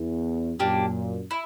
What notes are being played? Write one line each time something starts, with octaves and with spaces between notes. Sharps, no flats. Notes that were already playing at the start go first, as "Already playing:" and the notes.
Already playing: E2
F#2 A#2 A#3 D4 G4
E4